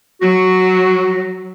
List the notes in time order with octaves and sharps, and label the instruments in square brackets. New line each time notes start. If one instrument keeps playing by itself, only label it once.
[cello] F#3 [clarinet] F#4